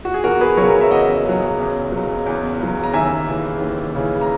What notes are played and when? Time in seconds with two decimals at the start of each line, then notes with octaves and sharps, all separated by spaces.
0.05 F#4
0.14 G#4
0.24 E2 F#4 A#4
0.41 G#4 B4
0.57 C#3 F#3 A#4 C#5
0.81 E5
0.91 E2 D#5 F#5
1.25 C#3 F#3
1.58 E2
1.92 C#3 F#3
2.26 E2
2.60 C#3 F#3
2.84 A#5
2.93 D#2 E5 G#5
3.28 C#3 E3
3.61 D#2
3.95 C#3 E3
4.21 A#5